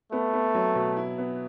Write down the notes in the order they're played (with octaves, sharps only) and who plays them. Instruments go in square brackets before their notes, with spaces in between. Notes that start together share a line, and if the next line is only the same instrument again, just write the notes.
[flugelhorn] A3 [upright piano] B3
[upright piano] B3
F#3
B2
E4
B3